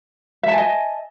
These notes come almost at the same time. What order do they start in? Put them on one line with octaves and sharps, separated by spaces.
E5 A5 G#5 D#5